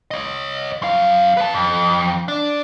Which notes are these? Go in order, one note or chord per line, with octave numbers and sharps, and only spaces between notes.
C#5 D#5
F#2 F5
B4 A5
F2
D4